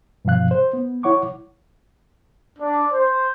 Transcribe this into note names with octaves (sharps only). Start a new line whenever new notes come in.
G2 B2 F3 F5 F#6
C5
B3
E4 C#5 F#5 C#6 D6
D4
C5